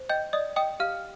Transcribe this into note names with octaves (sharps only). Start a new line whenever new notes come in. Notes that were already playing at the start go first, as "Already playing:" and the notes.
Already playing: C5
D#5 G5 G6
D5 D#5 D#6
D#5 G5 D#6
G4 F5 F6